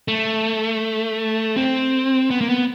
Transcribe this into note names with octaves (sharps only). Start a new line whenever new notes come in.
A3
C4
B3
A#3
B3